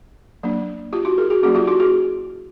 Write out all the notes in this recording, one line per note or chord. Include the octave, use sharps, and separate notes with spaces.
F#3 A#3 D4
F4 G4
E4 F#4
G#4 A#4
F#4 G#4
F#3 A#3 C#4 F#4 G#4
F4 G4
E4 F#4
F#4 G#4